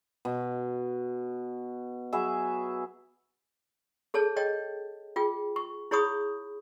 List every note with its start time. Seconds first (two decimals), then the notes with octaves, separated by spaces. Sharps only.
0.25 B2
2.13 F#3 G#4 B4 E5
4.14 G#4 A4 C#5 A5
4.36 C#5 D#5 G5
5.16 F4 G#4 G5
5.56 C#6
5.91 E4 G#4 C#5 B5 C#6 D#6